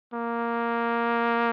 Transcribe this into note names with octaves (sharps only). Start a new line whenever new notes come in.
A#3